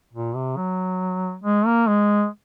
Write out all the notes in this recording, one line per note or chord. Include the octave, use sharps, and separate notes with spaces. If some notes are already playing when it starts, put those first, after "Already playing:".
A#2
C3
F#3
G#3
A#3
G#3